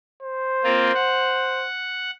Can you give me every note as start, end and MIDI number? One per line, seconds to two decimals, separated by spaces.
0.22 1.67 72
0.64 0.92 58
0.64 0.92 60
0.64 0.92 65
0.94 2.11 78